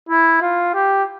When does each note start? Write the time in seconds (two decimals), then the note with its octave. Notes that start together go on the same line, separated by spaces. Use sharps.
0.09 E4
0.41 F4
0.74 G4